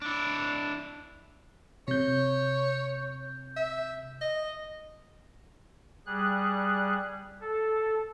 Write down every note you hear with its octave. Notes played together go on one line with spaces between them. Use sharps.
D4 E4
C3 C#5 G6
E5
D#5
G3 G#4 F#6
A4